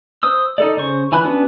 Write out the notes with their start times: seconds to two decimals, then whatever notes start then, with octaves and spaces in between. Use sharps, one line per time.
0.23 C5 D#6 E6
0.58 D#4 A4 D5
0.77 C#3 C5 C#6
1.12 E3 G#5 B5 F#6
1.24 B3 C#4 D4 F#4 B4